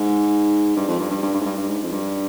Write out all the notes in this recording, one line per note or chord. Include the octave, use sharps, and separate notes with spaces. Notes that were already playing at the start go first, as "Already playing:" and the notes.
Already playing: G#2
G2
F2
G2
G2
G2
G2
G#2
G2
G2
G#2
F2
G2